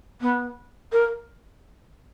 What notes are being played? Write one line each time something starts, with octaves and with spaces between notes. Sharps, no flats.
B3
A#4